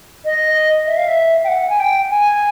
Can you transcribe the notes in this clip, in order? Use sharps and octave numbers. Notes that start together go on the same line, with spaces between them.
D#5
E5
F5
E5
G5
F#5
G#5
G5
G#5